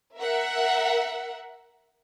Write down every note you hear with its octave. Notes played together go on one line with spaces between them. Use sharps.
A#4 E5 F#5